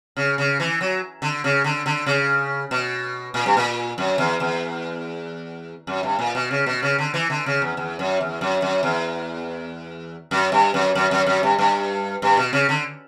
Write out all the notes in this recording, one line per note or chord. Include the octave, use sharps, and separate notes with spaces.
C#3
C#3
E3
F#3
D3
C#3
D3
D3
C#3
B2
A#2
G2
A#2
F#2
E2
E2
F#2
G2
A#2
B2
C#3
B2
C#3
D3
E3
D3
C#3
E2
E2
F#2
E2
F#2
F#2
E2
F#2
G2
F#2
F#2
F#2
F#2
G2
G2
G2
B2
C#3
D3